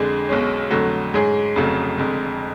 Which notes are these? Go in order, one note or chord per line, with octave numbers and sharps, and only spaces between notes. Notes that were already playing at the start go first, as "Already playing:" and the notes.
Already playing: F2 D3 G#3 D4 G#4
B1 B2 G#3 C#4
F2 D3 F#3 A3
G#2 G#3 C#4 G#4
F1 F2 C#3 F#3 A3
F1 F2 D3 G#3